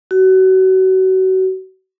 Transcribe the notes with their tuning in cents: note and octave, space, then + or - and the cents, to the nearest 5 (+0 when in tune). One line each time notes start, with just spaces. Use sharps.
F#4 +30